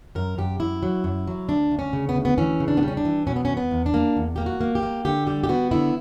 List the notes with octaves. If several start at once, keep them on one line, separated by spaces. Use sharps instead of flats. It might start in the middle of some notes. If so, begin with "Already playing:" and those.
F#2 A#4
F#2 G4
F#2 E4
F#3
F#2
F#3
D2 D4
D2
C#4
C#3
B3
D2
B3
E3 C#4
C#3
D4
B3
G3
C#4
D4
E3
B2 C#4
B3
C#4
E2
B3
E2
D4
A#3
E2
A#3 G4
F#4
A#3
G4
A#3
D3 G4
G3 G4
G4
B3 F#4
D3 E4